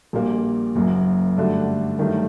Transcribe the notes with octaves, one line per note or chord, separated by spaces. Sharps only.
A#1 A#2 G3 A#3 F#4
F#1 F#2 F#3
G2 D3 A3 D4 F#4
G2 D#3 F#3 A3